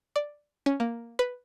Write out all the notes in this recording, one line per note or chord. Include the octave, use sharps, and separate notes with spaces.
D5
C#4
A#3
B4